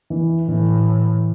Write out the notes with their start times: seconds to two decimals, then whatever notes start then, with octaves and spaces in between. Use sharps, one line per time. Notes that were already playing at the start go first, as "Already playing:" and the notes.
0.10 E3
0.48 A2 E3